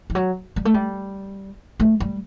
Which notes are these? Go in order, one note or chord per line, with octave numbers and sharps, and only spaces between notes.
E3
F#3
G3
A3
G3
A3
G3